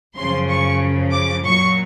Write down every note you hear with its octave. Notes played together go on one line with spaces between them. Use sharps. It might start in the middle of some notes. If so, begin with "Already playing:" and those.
F#2 C#3 F3 C6
C#6
D6
A#2 F#3 C#6